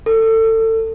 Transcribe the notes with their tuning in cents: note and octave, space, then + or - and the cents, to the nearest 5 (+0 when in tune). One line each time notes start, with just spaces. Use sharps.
A4 +25